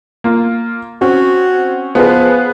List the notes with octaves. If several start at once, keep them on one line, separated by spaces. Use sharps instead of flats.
A#3 F4
C4 C#4 F#4
F3 B3 G#4 B4